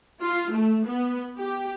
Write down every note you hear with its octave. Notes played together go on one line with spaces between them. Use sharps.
F4
A3
B3
G4